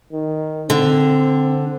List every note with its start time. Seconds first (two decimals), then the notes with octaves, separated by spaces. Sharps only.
0.12 D#3
0.70 D3 C4